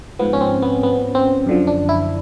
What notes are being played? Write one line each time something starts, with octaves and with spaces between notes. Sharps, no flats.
G#2 F3 B3
C#4
C4
B3
B3
C4
F#2 D3 F3
D4
E4